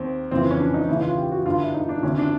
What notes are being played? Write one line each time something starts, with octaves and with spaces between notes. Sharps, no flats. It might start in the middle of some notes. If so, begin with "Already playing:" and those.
Already playing: D#2 D#3 C4
F2 C#3 E3 C4
C#4
D4
D#4
D#2 C#3 E3 E4
F4
G4
F#4
G2 D3 F4
E4
D#4
D4
D2 C3 D#3 C#4
D4